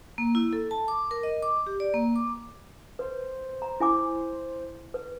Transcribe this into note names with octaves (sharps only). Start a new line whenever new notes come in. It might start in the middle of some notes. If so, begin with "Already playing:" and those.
A#3
E4
A4
A5
D6
A#4
D#5
D6
G4
D5
A#3
D6
B4 C5
A#5
E4 G#5 D6
B4